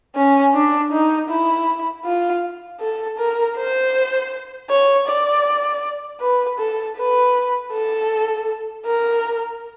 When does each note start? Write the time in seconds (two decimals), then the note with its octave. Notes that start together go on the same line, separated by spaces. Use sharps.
0.16 C#4
0.54 D4
0.92 D#4
1.30 E4
2.05 F4
2.80 A4
3.18 A#4
3.57 C5
4.70 C#5
5.07 D5
6.20 B4
6.58 A4
6.97 B4
7.72 A4
8.86 A#4